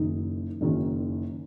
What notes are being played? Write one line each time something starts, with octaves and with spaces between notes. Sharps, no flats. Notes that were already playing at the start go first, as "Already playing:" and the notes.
Already playing: F#1 F#2 D#3 D#4
F#1 F#2 D#3